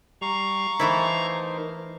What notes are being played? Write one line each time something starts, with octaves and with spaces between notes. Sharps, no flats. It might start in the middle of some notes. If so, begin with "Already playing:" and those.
G3 F5 A#5 C#6
E3 A3 D#4 E4 A#4 C5